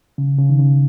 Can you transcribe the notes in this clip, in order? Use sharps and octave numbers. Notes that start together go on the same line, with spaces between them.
C#3
C#3
D#3
C#3